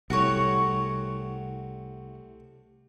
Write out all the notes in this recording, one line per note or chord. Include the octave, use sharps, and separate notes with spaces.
C2 C3 A3 F#4 C#5